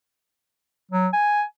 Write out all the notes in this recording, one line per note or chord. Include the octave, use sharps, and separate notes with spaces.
F#3
G#5